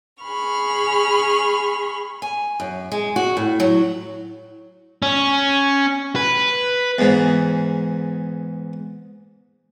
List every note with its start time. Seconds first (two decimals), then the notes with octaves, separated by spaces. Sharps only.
0.23 G#4 B5 C#6 F6
2.22 G#5
2.60 F#2
2.92 G#3
3.16 F#4
3.37 A2
3.60 F#3
5.02 C#4
6.16 B4
6.98 E2 G#2